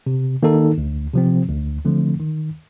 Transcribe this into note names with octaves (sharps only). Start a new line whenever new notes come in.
C3
D#3 A#3 D#4 A4
D2
C3 F3 C4
D2
D3 F3 A3 C4
D#3